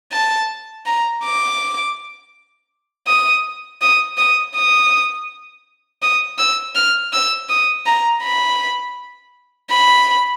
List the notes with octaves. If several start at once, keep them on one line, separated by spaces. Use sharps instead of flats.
A5
A#5
D6
D#6
D#6
D#6
D#6
D#6
E6
F6
E6
D#6
A#5
B5
B5